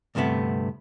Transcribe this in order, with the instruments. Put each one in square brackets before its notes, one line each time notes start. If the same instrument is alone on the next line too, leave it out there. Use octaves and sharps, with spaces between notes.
[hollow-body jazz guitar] D2 G2 C3 A3 B3